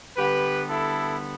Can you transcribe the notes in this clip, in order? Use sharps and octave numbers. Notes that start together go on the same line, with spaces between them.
D3 G3 B3 G4 B4
E4 A4